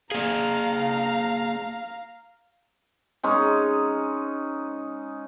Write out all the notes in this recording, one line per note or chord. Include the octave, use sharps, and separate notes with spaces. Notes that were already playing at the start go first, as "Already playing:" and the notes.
A#3 G#4 F5 A#5
G#3 C#4 D#4